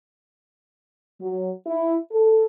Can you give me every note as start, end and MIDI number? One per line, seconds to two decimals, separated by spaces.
1.20 1.50 54
1.66 1.95 64
2.12 2.45 69